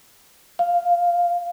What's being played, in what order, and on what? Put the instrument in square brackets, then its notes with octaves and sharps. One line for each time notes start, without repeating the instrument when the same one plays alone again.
[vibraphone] F5